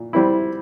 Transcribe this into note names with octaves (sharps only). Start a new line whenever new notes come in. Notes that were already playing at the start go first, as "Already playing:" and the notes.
Already playing: A#2
G3 C4 E4